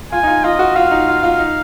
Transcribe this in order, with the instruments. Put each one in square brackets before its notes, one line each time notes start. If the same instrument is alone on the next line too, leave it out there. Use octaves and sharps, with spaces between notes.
[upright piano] F4 [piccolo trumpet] G#5
[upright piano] D#4
F4
[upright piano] F4 [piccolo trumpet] D#5
[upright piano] F#4
[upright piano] F4 [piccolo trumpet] F5
[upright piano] D#4
F4
F4
D#4